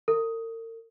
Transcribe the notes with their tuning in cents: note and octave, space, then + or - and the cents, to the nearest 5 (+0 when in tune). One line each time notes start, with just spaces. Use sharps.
A#4 -45